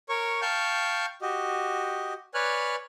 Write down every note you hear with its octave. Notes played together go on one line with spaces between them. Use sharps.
A#4 C#5 C#6
F5 G5 A5 C#6 F6 G6
F#4 G4 D#5
B4 C#5 D5 G#5 F6 F#6